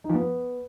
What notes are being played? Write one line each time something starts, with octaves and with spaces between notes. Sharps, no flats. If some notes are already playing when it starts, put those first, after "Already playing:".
D#4
F3
B3